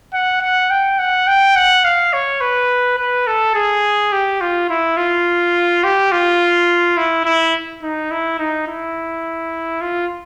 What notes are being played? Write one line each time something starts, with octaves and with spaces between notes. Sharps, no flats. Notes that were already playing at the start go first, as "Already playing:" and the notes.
F#5
F#5
G5
F#5
G5
F#5
F5
C#5
B4
B4
A4
G#4
G4
F4
E4
F4
G4
F4
E4
E4
D#4
E4
D#4
E4
F4